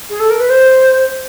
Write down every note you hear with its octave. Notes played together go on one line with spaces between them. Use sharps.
G#4
A4
A#4
B4
C5